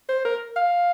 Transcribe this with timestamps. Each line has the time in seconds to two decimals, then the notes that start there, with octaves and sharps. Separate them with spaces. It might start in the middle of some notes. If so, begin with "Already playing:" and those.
0.09 C5
0.25 A#4
0.57 F5